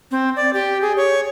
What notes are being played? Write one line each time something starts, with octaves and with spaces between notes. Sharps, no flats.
C4
D5
G4
G#4
C#5